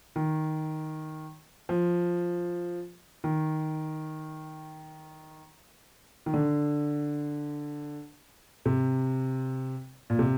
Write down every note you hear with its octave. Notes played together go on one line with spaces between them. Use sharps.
D#3
F3
D#3
D#3
D3
C3
A#2
C3